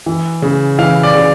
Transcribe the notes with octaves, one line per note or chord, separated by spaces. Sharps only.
E3
C#3
E3 F5
D5
C#3